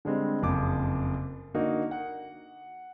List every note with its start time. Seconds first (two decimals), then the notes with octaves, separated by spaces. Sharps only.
0.05 D3 G3 G#3 C4
0.43 F#1 F2 D6
1.54 D3 A#3 D#4 F#4
1.91 F#5